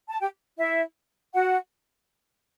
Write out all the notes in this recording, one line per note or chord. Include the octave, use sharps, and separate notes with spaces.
A5
G4 G5
E4 E5
F#4 F#5